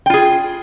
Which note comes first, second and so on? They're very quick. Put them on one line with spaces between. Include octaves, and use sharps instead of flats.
G5 F4 G#4